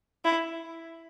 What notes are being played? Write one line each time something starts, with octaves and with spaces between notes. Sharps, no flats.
E4